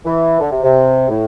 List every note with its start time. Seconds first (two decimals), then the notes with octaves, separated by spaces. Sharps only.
0.05 E3
0.40 D3
0.51 C3
0.63 C3
1.09 A2